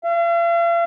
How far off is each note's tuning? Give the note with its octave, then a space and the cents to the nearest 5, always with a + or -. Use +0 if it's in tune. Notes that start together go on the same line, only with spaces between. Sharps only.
F5 -45